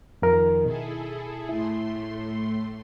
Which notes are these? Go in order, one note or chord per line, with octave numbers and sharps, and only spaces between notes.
F2 D#3 F3 A#4
B2 E4 G#4 A4
A2 A3 E4 C6